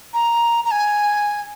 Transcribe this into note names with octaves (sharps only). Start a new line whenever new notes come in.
A#5
A#5
G#5